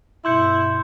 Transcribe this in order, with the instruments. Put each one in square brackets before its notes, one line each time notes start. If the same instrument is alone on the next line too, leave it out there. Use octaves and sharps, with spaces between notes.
[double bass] G2 B2 [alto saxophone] E4 [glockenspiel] C6 G6 C#7